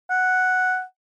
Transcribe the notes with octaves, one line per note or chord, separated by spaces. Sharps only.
F#5